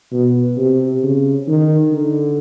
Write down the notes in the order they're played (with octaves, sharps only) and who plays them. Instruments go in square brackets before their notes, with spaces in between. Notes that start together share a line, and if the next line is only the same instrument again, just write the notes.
[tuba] B2
C3
C#3
D#3
D3